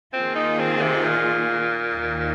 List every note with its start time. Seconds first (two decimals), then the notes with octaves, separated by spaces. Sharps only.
0.13 D#3 A#3 C4 F4 G#4
0.35 D#4
0.59 C4
0.82 C3
1.04 A#2
1.95 D#2 D#3 A#3 D#4